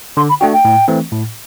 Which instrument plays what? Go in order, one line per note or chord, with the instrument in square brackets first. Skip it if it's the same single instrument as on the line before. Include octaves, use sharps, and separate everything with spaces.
[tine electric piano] D3 [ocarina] C6
[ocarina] B5
[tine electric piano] A3 D4 F#4 [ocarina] G5
[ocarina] G5
[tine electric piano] A2
E3 A3 C4
A2